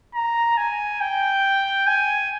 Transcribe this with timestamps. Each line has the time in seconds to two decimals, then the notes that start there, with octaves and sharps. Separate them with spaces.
0.14 A#5
0.57 G#5
1.01 G5
1.87 G#5